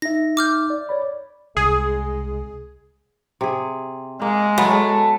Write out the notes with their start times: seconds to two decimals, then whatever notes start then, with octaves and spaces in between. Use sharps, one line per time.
0.02 D#4 E5 A#6
0.37 D6 F6 G6
0.70 D5
0.89 C#5 D5 B5
1.57 C2 G#3 G#4
3.41 C3 G#4
4.22 G#3 A#3
4.58 F#3 A3 B3